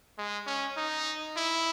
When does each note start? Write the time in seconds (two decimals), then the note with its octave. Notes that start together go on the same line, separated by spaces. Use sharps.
0.18 G#3
0.47 C#4
0.77 D#4
1.36 E4